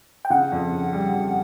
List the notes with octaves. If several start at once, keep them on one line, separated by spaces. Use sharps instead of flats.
G5
C#3 F#5
F2
C#3
G3
F2